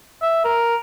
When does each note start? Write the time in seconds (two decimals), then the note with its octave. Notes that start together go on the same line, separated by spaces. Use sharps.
0.22 E5
0.44 A#4